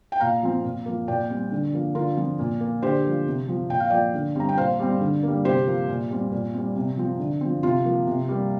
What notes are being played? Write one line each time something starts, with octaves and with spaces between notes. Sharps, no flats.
G5
A#2 F5 A#5
F3 C4
A#2
F3 A#3
A#2 D5 G5
G3 C4
D3
F3 A#3
D3 F4 A#4
F3 C4
A#2
A#3
D3 G4 C5
F3 A#3
C3
F3 C4
A#2 G5
F5
F3 A#3 D5 G5
D3
G3 C4 A#5
G5
A#2 C5 F5
G3 C4
D3
G3 A#3
C3 G4 C5
F3 A#3
A#2
G3 C4
A#2
G3 C4
C3
F3 C4
D3
F3 C4
C3 F4
F3 A#3
C3
G3 A#3